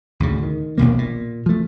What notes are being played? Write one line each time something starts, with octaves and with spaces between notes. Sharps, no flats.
D2 A2 C#3
D#3
D#1 A#1 B2 A#3
A#2
F3 A3